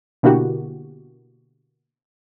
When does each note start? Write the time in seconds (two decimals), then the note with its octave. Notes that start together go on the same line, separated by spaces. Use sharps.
0.23 B2 D3 A#3 E4 F#4 G4